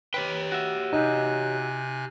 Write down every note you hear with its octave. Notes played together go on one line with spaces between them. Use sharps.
G4 B4 C#5 G5
F#4 E5
C3 D#4 G#5 F#6